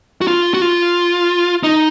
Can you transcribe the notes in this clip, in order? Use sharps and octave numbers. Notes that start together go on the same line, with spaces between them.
F#4
F4
F#4
F4
D#4